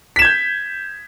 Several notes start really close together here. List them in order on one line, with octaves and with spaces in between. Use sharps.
B6 E7 G#6 G6